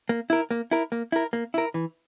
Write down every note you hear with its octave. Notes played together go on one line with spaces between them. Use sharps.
A#3
E4 A#4
A#3
E4 A#4
A#3
E4 A#4
A#3
E4 A#4
E3